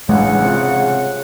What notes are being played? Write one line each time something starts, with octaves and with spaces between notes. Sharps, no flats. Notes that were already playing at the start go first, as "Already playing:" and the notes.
A1 G2 C#3 G#3 F#5
C3 F4